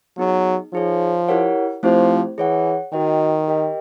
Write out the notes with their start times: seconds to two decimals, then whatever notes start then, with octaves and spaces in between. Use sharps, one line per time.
0.18 F#3 B3 D#4 G#4
0.73 F3 D#4 G#4 C#5
1.28 E4 G4 A#4 C#5 F#5
1.83 F3 A3 C4 E4 G4 C5
2.38 E3 G#4 C#5 F#5
2.92 D#3 F#4 B4 D#5 G5
3.48 G4 A#4 D#5 G5